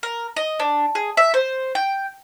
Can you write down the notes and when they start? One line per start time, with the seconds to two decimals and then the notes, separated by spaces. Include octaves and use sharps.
0.03 A#4
0.36 D#5
0.60 D4
0.95 G#4
1.17 E5
1.34 C5
1.75 G5